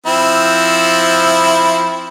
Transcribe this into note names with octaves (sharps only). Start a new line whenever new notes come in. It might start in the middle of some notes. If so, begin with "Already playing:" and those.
F3 C4 E4